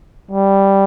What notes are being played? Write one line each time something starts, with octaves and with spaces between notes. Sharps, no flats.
G3